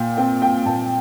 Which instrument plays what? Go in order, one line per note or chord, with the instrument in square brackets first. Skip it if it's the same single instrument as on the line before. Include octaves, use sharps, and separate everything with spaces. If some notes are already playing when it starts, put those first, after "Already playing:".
Already playing: [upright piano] A#2 G5
C4 G5
G5
A#2 A5